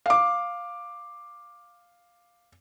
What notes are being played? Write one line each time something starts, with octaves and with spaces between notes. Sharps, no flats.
F5 D6